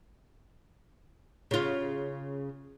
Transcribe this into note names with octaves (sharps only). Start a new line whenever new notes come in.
C#3 F4